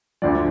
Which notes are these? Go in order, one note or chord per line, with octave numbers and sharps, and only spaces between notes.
D2 D3 F3 D5